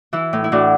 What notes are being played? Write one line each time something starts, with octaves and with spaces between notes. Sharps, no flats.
E3 E4
A2
E4
A2 D4 F#4